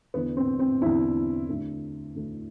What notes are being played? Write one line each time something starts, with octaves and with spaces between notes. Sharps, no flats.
E2 D3 B3
C4
C4
E2 D3 C4 E4
D2 D3
D2 D3